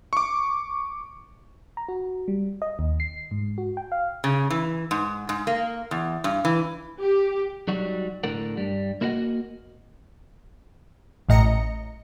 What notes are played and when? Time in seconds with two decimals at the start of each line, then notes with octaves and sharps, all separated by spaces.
0.13 C#6 D6
1.77 A#5
1.88 F#4
2.28 G3
2.62 D#5
2.79 D#2
3.00 C7
3.31 G#2
3.58 F#4
3.77 G5
3.92 F5
4.24 C#3
4.50 E3
4.91 G#2
5.29 G#2
5.47 A#3
5.91 E2
6.24 G2
6.45 E3
6.99 G4
7.68 F#3 G3 D#4 F#4
8.24 A2 D3 A4 A#4 F#5
8.57 G2 G3
9.01 A#3 E4 F#4 A4 D#5 F#5
11.29 A1 A2 D#5 A#5 C#7